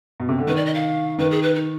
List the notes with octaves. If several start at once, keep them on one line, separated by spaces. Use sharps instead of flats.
B2
C3
D3
D#3 B4
D5
D#5
F5
D#3 B4
G#4
B4
D#4